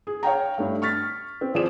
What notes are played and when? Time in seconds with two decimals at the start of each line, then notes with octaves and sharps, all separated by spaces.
0.07 G#4
0.23 C#5 F5 G5 A#5
0.58 G2 A3
0.82 C#6 F6 A6 B6
1.41 C4
1.54 F3 G#4 C5 D5 E7